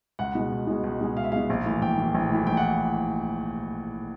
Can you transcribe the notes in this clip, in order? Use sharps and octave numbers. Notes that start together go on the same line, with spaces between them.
C#2 F#5
B2 G#3
C#2
B2 G#3
C#2
B2 G#3
C#2 F5
E5
B2 G#3 F5
A#1
A2 E3
A#1 G5
A2 E3
A#1
A2 E3
A#1 G5
F#5